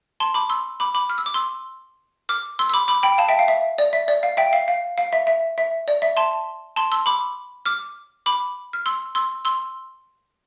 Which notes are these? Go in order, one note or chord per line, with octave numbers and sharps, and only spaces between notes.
A5 C6
B5 D6
C6 E6
B5 D6
B5 D6
F6
E6
D6
C6 E6
D6 F6
C6 E6
E6
B5 D6
B5 D6
G5 B5
F5 A5
E5 G5
F5
E5
D5
E5
D5
F5
E5 G5
F5
F5
F5
E5
E5
E5
D5
E5
A5 C6
A5 C6
C6 E6
B5 D6
D6 F6
B5 D6
F6
C6 E6
C6 E6
C6 E6